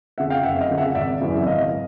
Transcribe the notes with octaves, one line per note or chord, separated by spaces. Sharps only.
F2 C#3 E5 F#5
F5 G5
F#1 E5 F#5
E5
D#5 F5
F2 C#3
E5 F#5
G#1 D5 E5
F#2 C#3 E3
E5
G#1 D#5 F5